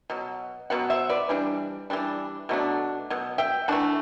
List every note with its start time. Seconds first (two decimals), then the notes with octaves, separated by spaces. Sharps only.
0.10 B2 F#3
0.70 B2 F#3 B3 F#5
0.90 C5 E5
1.09 B4 D5
1.29 E3 G3 D4
1.90 E3 G3 D4
2.49 B2 F#3 A3 D4
3.10 B2 F#3
3.38 E5 G5
3.68 E3 A3 D4 F#5 A5